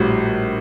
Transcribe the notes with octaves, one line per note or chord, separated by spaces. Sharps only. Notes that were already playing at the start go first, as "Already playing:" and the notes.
Already playing: A#1 A2 G3 F#4